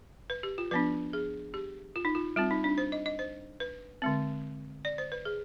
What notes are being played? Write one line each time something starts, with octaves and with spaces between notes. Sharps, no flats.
B4
G4
F4
F3 B3 D4 B4
G#4
G4
F4
D#4
F4
G3 C4 F4
D#4
D4
C5
D#5
D#5
C5
B4
D3 G#3 C4
D5
C5
B4
G#4